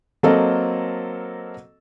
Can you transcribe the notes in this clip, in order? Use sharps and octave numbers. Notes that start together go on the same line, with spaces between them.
F#3 A#3 C4 A4 A#4 D#5